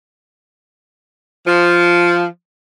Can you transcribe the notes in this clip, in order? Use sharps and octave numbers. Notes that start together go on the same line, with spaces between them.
F3